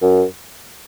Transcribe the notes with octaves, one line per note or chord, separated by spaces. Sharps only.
F#2